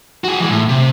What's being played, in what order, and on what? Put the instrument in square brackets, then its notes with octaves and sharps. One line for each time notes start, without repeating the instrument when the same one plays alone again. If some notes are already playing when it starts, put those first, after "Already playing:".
[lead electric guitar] F#4 G#4
E3 G#3
A2
C3